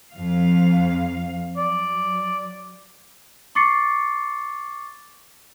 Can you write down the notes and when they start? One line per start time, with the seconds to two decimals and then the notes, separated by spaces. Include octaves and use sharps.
0.14 F2 F5
1.57 F#3 D5
3.55 C#6 D6 A6 C7 C#7